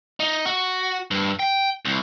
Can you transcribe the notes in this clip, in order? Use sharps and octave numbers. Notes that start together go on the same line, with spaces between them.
D#4
F#4
G2
G5
C2